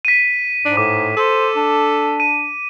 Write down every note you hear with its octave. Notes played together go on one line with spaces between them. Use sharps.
B6 D#7
G#2 D4
A2 D6
A4 C5
D4
D#7